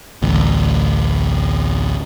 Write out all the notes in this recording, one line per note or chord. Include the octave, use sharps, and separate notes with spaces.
A1 D2